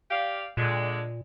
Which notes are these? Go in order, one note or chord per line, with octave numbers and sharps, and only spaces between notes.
G4 D5 F5
A#2 D3 G#3